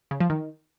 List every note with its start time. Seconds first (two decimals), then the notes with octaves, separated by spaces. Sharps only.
0.11 C#3
0.20 F3
0.30 D#3